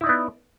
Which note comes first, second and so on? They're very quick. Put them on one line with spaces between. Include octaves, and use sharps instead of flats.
E4 D#4 D5 B3